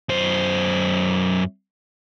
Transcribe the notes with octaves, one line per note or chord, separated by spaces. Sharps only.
F#2 C5